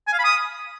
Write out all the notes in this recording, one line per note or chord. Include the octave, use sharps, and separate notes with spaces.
G#5
F5
B5
D#6